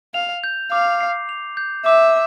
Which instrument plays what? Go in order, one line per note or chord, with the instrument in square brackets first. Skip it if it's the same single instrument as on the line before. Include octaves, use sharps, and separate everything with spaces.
[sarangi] F5 [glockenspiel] F7
[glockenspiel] G6
[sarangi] F5 [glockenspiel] D6
[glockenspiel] C7
F7
G6
[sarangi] E5 [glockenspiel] D6